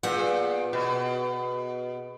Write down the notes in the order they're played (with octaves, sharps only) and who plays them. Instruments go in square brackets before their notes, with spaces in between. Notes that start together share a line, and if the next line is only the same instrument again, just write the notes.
[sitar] A#2 [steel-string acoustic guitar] B3 G#4 F#5
[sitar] B2